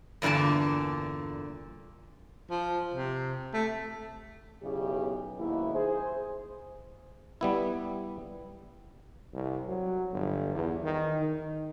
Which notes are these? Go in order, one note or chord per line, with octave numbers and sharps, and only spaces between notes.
E2 G2 A#2 D3 A5
F3
C3
A3
B1 E2 C#3 G4
F#1 D#2 G#2 B2 A#3 E4
G#4 C5
G3 B3 E4
C2
F#3
G1
E2
D#3
D#3